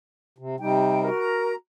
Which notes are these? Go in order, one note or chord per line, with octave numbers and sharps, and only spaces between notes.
C3
C3 G3 D#4 G5
F#4 A#4
A#5